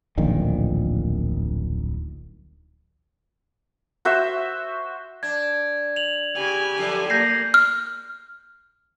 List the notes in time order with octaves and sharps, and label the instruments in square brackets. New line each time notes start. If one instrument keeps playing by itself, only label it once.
[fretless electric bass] D1 A#1 A#2 D#3
[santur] F#4 C5 E5
[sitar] D4 [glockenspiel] G#6
[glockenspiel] F7 F#7
[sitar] C#3 [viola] G4 G#5
[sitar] F#2 D3 F3
[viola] A#3 [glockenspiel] G6 A#6 C7
[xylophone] F6